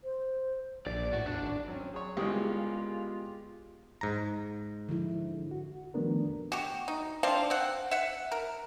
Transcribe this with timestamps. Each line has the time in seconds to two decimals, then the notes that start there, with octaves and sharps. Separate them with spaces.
0.04 C5
0.86 A#1 D5
1.13 A2 F#4
1.26 E2 D4
1.42 G#1
1.68 F#3 C4 C#4
1.93 F#3 G#4 C#5
2.17 C2 C#3 G#3 B3 F4 G4 G#4 D#6
4.01 G#2 A#5
4.89 D3 F3 E4
5.51 F#4
5.94 D#3 F3 A3 B3 D4 A#4
6.52 F#4 G4
6.88 D#4
7.23 C4 D4 F4 F5
7.50 C4 F#5
7.91 E5 F#5
8.32 A#4